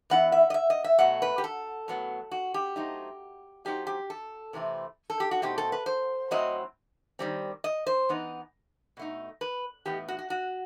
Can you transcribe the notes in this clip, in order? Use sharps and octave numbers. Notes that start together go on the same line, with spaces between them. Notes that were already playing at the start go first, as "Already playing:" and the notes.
E3 B3 E4 F#5
E5
D#5
E5
D#5
E5
B2 F#3 A3 F#5
B4
G4
A4
A2 F#3 B3
F#4
G4
F#3 A3 C4 D#4
F#3 C4 D#4 G4
G4
A4
C3 E3 A3 C4 E4
A4
G4
F#4
B2 A3 C4 D#4 G4
A4
B4
C5
A2 F#3 C4 E4 D#5
D#3 G3 C4
D#5
C5
E3 B3 D#4
B2 A3 D#4
B4
A2 E3 B3 D#4 G4
F#4
F#4
F#4